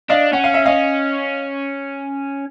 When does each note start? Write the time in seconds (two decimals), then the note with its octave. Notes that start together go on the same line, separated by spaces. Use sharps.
0.09 D4 D#5 F5
0.33 C#4 F#5
0.44 F5
0.54 E5
0.65 C#4 D#5 F5